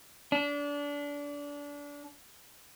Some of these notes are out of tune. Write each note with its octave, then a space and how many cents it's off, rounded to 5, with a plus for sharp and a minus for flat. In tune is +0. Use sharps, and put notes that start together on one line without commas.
D4 -25